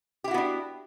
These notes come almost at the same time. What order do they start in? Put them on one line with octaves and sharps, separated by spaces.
G4 E4 F#4 B3 D4